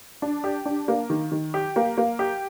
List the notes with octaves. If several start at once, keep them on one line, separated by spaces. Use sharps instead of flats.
D4
G4
D4
A#3
D#3
D#3
G4
A#3
A#3
G4